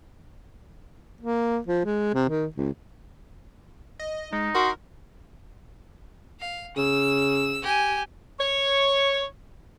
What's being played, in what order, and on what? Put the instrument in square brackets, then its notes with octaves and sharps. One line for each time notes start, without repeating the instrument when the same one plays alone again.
[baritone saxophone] A#3
F3
G#3
C3
D#3
C#2
[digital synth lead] D#5
[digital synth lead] G#3 [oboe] D#4
[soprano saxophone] F#4 [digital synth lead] A#4 [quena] C6
[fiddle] F5
[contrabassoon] C#3 [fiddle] E6
[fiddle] G4 G#5
[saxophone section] C#5